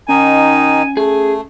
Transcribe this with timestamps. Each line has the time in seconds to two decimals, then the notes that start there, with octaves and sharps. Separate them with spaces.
0.09 D#3 C#4 D#4 G#5
0.97 A3 G#4